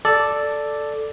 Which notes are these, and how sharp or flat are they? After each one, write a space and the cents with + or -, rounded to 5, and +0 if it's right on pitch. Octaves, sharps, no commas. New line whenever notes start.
A4 +0 D5 +0